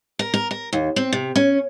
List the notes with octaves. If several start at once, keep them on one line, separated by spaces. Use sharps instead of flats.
A#4
A#4
A#4
D#2
C4
C3
C#4